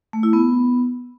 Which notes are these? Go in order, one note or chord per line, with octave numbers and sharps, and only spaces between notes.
A3
E4
B3